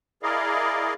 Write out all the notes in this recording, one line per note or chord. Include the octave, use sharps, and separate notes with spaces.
E4 G#4 A#4 D5 D#5 F5